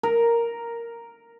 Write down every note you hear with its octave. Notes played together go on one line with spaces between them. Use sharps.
A#4